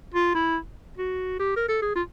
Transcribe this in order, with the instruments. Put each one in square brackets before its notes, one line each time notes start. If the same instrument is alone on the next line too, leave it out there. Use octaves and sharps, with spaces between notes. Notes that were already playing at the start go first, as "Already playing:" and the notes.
[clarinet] F4
E4
F#4
G4
A#4
A4
G#4
F4